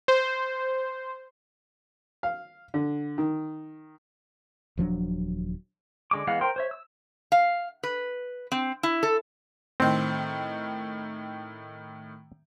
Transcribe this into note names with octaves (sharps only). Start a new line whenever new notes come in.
C5
F5
D3
D#3
D#1 F3 F#3 D4
D3 G#3 D6
E3 G#3 B3 F5 F#5
A#4 C5 G5 C6
C5 C#5 E5
E6
F5
B4
C4
E4
A4
A2 D#3 C4